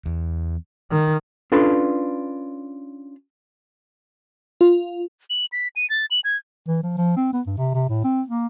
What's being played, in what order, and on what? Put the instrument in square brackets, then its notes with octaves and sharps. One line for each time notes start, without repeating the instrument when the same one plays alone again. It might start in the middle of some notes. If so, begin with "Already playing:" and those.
[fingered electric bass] E2
[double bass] D#3
[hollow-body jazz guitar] C#4 D4 F4 A4 B4
[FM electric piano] F4
[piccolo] F#7
B6
D#7
A6
F#7
G#6
[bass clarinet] E3
F3
F3
C4
B3
G2
C3
C3
A2
C4
A#3